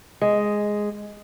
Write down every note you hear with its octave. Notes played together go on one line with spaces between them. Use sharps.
G#3